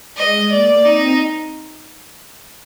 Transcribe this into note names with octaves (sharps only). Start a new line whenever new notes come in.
G#3 D#5
A#3 D5
C4 D#4